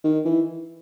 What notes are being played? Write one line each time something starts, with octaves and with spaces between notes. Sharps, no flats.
D#3
E3